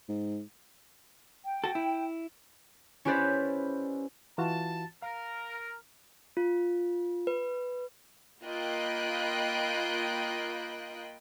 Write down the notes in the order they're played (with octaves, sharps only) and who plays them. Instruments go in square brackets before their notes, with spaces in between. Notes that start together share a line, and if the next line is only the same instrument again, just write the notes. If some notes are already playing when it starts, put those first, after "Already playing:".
[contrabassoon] G#2
[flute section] G5
[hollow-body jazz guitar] F#4 A4
E4
[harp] C#4 E4 G4 B4 C5 D5
[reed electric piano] E3 F4 F#4 [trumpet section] A5
[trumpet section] A#4 [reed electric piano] F5
[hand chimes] F4
B4
[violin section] A#3 F4 D#5 G5 B5 F#6